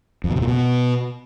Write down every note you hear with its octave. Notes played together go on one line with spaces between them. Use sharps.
F2
B2
C3
A#2
B2